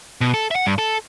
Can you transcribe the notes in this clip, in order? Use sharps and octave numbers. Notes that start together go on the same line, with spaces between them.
B2
A4
E5 F#5
G2
A4